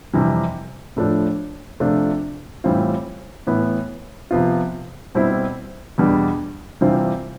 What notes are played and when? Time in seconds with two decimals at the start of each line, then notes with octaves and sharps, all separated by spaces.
0.13 F2 C3 E3 G3
0.96 A2 F3 A3 D4
1.80 C3 F3 A3 D4 F4
2.64 A2 E3 G3 C4 F4
3.47 A2 E3 B3
4.31 C3 F3 B3 F4
5.15 B2 G3 C4 E4
5.98 E2 B2 G3 D4
6.81 C3 E3 G3 C4 F4